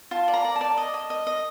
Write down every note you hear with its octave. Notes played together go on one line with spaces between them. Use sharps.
F4 A5
D5
A#5
D5
A5
D5
D#5
D#5
D#5
D#5